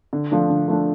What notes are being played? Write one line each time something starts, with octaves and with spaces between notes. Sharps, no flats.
D3
F3 A3 D4
D3
F3 A3 D4